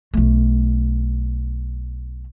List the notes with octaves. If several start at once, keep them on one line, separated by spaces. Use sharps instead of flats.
B1 A3